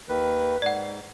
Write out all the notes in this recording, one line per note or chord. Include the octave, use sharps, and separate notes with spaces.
D#2 D#3 B4
G#2 D5 F#5